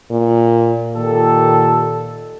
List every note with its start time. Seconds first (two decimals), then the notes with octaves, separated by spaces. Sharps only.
0.10 A#2
0.96 A#2 D#3 G4 A4